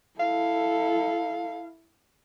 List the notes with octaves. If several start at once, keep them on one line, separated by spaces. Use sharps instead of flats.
E4 A4 F5